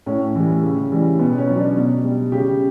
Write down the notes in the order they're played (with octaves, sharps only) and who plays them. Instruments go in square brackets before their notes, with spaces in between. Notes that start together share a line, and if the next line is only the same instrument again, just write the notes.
[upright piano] A2 C#4
E3 G3
C#3
E3 G3
B2 B3
C#4
F#3
D4
B2
G3
C#3 G4